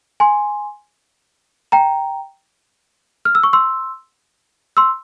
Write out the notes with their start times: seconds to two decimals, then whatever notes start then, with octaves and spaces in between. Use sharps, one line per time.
0.20 G#5 C6
1.72 G5 A#5
3.25 F6
3.35 E6
3.43 C#6
3.53 C6 E6
4.77 C6 E6